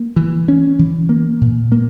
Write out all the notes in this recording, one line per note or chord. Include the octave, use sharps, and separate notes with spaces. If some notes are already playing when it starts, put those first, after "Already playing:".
Already playing: A#3
E3
C#4
E3
A#3
A#2
A#3